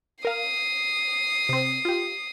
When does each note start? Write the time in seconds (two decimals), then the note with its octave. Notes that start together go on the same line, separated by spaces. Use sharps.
0.25 A#4 F5 D#6 C7
1.49 C3 C4
1.85 F4 G4